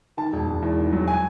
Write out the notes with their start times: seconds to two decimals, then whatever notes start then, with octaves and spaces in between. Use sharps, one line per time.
0.17 D#3 A5
0.33 E1
0.47 E1
0.62 E2
0.77 D#3
0.92 F#3
1.07 G#5